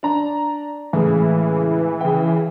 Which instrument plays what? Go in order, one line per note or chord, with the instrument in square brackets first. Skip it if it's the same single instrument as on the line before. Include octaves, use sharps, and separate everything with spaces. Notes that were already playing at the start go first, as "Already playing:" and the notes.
[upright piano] D4 A#5
[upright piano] A2 C#3 G#3 [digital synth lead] E3
[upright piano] C#3 G5